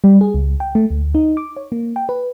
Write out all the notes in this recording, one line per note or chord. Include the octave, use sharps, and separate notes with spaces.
G3
G#4
C#2
G5
A3
D2
D#4
D6
C#5
A#3
G5
B4